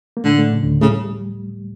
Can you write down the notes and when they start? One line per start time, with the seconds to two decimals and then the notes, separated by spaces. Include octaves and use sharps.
0.17 A#3
0.24 A2 D3 A3
0.39 A2 A3
0.53 C#3
0.62 D2 D3
0.81 A2 C#3 A3
0.91 G3